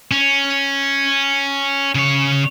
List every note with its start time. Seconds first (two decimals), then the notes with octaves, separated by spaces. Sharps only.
0.11 C#4
1.95 C#3 C#5